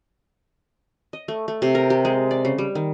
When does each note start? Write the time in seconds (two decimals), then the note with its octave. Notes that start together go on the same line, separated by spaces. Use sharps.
1.13 D#5
1.28 A3
1.48 A3
1.62 C3
1.75 A#4
1.90 G4
2.05 G#3
2.31 D5
2.45 C#3
2.58 G3
2.75 D#3